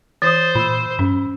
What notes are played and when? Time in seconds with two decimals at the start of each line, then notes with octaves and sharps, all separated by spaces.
0.22 E3 C5 D#6 A6
0.55 A#2 B5 E6
0.99 G2 C#4